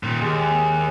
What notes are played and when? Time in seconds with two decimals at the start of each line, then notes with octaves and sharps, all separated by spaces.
0.03 A#2 D#3
0.21 D#2 G#3 G4